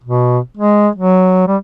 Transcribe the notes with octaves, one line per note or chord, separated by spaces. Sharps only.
B2
G#3
F#3
G3